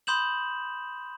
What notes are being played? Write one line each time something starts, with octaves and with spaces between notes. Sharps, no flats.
B5 C6 D#6 G6 E7 F#7